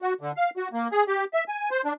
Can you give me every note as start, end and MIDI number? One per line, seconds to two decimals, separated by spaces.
0.02 0.13 66
0.21 0.32 50
0.37 0.50 77
0.57 0.68 66
0.73 0.88 58
0.92 1.04 68
1.08 1.25 67
1.34 1.44 76
1.48 1.69 80
1.71 1.82 72
1.85 1.93 62